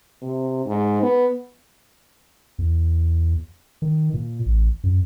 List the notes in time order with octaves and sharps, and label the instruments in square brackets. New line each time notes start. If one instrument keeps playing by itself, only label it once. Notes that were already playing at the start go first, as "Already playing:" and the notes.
[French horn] C3
G#2
B3
[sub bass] E2
D#3
A#2
A1
F#2